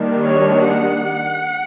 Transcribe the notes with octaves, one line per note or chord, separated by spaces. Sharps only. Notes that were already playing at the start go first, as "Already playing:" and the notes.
Already playing: D#3 G3 A#3 D4
C#5
F#5